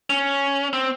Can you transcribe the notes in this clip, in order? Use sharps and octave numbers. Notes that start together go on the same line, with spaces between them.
C#4
C4